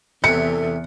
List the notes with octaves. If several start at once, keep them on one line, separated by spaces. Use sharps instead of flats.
E2 C3 E3 A4 C#7